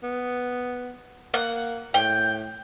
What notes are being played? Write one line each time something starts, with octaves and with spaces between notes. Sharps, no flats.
B3
A#3 F#5
A2 G5